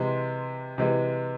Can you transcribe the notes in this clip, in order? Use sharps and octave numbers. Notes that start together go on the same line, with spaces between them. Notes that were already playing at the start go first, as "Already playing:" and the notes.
Already playing: C3 E3 G#3 C6
C3 E3 G#3